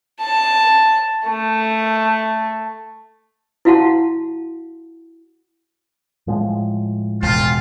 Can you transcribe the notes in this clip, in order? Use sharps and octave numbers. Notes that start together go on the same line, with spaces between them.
A5
A3
E4 F#4 F5 F#5 A5 C6
A2 F3 G#3
E1 F4